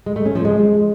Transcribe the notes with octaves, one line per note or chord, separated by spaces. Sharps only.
G#3
A3
C#4
F3
G#3